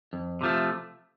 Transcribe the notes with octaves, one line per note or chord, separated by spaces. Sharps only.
F2
C3 F3 A3